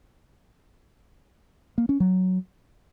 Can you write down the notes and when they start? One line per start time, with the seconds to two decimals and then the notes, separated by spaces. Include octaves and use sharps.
1.78 A#3
1.89 C#4
2.00 F#3